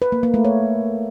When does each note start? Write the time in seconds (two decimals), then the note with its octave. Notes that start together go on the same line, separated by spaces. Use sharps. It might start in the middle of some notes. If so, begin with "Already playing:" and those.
0.02 B4
0.12 A#3
0.23 A#3
0.34 A3
0.45 C#5